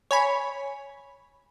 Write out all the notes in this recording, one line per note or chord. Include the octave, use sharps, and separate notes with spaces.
C#5 G#5 B5